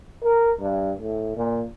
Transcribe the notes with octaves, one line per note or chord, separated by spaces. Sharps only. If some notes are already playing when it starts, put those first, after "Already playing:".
A#4
G2
A2
A#2